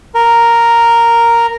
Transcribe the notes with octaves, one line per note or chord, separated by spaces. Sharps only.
A#4